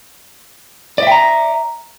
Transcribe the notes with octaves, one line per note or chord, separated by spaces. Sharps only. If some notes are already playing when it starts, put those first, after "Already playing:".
D5 E5 G5 A#5